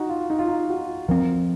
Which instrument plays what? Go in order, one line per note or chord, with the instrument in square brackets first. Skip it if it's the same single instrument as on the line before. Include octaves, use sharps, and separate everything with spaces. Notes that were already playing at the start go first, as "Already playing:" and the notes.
Already playing: [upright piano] D#4 F#4
F4
D#4
F4
D#4
F#4
[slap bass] F3 C4 [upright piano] A#4